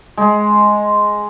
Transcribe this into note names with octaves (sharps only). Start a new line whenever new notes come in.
G#3